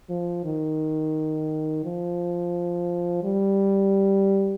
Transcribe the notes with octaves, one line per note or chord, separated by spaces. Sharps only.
F3
D#3
F3
G3